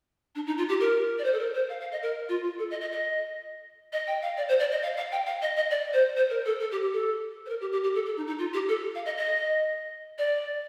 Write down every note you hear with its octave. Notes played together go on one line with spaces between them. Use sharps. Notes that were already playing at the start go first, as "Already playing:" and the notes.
D4
D#4
F4
G4
A#4
D5
C5
A4
A#4
C5
F5
F5
D#5
A#4
F4
F4
A4
D#5
D#5
D#5
D#5
G5
F5
D5
C5
D5
D#5
F5
F5
G5
F5
D#5
D#5
D5
C5
C5
A#4
A4
A4
G4
G4
A4
C5
A#4
G4
G4
G4
A4
A4
D#4
D#4
F4
G4
A4
F5
D#5
D#5
D5